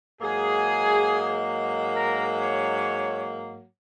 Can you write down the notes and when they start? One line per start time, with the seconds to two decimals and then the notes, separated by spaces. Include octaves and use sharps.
0.21 G#2 F#3 A#3 G#4
1.94 A#4
2.37 C#5